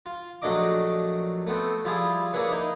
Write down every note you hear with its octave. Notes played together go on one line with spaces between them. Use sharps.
F4
A#1 F#3 A3 D4 D#5 D6
A3 B3 C4
F3 G3 E4 F4 G#4
A#3 D4 E4 G#4 B4 C#5
D#4 E4